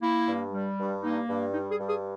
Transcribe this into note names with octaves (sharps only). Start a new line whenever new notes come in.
A#3 E4
G2
G3
G2
A#3 D#4
G2
G3 D#4
G#4
G2
G#4